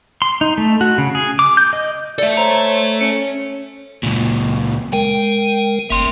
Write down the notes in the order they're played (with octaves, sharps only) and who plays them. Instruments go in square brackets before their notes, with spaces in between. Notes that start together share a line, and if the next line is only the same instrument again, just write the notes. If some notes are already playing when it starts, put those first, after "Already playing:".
[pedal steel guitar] C6
D#4
A3
F#4
C#3
G#4
D6
G6
D#5
[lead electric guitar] A4 E5 [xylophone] D5
[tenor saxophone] C5 [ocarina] C#5 [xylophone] A#5
[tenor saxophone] C#4 [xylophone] C#7
[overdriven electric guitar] C#2 A#2
[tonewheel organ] G#3 A#4 [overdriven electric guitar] G5
[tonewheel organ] G1 A#3 [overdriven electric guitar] E5 C6